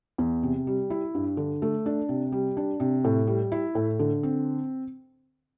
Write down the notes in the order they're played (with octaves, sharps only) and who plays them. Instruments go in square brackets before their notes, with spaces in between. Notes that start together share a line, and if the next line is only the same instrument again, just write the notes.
[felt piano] E2
C3
G3
E4
G2
D3
A3
D4
C3
G3
D4
C3
A2
G3
E4
A2
D3
C4